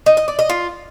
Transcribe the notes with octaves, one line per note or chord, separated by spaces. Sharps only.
D#4
D#5
D5
D#5
F4